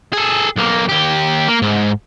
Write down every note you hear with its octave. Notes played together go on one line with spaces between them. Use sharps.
G#4 A4
B1 A#3
D#2 G4
A#3
G#2